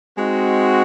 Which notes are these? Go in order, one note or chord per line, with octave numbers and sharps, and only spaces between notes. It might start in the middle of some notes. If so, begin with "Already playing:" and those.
G#3 C4 D#4 F#4